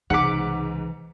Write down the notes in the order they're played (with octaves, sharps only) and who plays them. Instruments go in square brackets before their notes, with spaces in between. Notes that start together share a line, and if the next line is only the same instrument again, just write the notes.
[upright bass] C2 C#3 [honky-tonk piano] G#2 B6 [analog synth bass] E3 [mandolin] F#5 D6